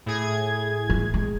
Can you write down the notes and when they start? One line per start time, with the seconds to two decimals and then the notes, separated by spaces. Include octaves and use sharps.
0.06 A2 G#4 G#6
0.90 E3 G3
1.14 G#3